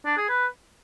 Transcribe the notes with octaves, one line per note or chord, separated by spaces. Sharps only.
D4
G#4
B4